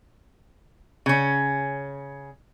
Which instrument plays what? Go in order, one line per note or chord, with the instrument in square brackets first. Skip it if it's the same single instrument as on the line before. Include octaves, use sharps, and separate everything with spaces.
[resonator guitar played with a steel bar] C#3 C#4